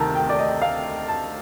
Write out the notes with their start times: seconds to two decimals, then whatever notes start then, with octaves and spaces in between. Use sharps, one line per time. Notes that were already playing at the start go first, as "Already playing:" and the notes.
Already playing: D2 C3 D#3 A5 A#5
0.15 G5
0.29 D5
0.38 D#5
0.62 F5
1.08 A5